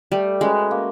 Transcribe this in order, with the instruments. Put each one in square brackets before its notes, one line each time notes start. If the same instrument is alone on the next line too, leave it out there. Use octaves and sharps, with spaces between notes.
[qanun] G3 [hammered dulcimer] A3
[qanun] G#3 [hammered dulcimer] C#4 F#4 B4
[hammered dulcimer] A#3